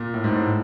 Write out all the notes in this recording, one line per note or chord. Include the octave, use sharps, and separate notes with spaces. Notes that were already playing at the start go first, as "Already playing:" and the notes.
Already playing: A#2
A2
G#2
A2